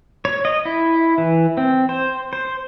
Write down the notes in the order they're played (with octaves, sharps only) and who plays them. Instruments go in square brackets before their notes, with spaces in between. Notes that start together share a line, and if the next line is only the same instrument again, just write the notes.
[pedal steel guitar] C#5
D#5
E4
E3
C4
C5
C5